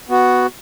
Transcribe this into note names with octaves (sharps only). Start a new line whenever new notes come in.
B3 F#4